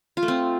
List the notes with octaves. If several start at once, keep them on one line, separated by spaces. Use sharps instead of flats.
F4
A3
C4